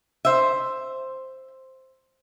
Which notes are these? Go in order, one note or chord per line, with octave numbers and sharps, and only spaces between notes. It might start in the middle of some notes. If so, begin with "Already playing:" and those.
C5 E5